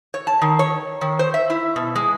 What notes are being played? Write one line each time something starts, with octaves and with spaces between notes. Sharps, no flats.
C#5
A5
D#3
C#5
D#3
C5
E5
E4
B2
G#3